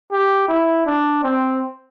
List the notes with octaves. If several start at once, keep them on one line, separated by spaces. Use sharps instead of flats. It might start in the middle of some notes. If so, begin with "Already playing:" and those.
G4
E4
D4
C4